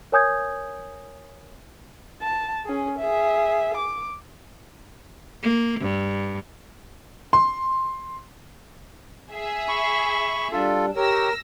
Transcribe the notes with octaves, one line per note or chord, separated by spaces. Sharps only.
A#4 C#5 G#5 D#6 G6 G#6
A5
C#4 G#4
G#4 E5
D6
A#3
G2
C6
G#4 E5
B5 C#6
G3 D4 F4 A4
G4 A#4 C#5 E6 A#6